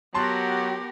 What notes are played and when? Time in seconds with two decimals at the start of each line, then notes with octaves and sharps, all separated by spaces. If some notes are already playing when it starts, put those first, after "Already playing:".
0.15 F#3 B3 F#4 G4 A#4 A5 C6 A6